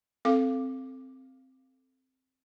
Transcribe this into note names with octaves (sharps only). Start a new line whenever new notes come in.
C4 A4 F5 D6